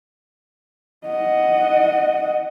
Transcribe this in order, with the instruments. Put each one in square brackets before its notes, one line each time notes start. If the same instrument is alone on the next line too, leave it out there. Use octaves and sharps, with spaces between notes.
[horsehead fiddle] D#5 F#5